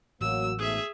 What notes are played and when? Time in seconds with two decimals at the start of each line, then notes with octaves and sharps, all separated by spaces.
0.21 A1 F#3 A#3 E6
0.59 G#2 B2 A3 G#4 E5